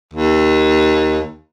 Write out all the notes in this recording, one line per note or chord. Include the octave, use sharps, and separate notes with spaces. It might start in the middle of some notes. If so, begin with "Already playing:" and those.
D#2